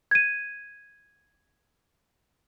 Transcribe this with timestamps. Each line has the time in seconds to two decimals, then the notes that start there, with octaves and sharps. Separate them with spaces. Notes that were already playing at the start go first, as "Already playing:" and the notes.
0.11 G#6 D#7